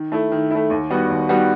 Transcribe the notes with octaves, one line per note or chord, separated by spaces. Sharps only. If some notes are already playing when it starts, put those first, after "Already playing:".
Already playing: D#3
A3 E4
D#3
A3 E4
D#2
D#3 G3 B3 F#4
D#2
D#3 G3 B3 F#4